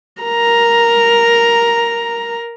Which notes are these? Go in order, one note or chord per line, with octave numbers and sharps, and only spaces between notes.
A#4 A#5